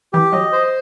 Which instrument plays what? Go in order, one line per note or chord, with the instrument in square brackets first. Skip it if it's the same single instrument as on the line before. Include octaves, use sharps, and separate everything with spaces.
[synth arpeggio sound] E3 [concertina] G4
[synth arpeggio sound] F#3 [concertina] D#5
[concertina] C5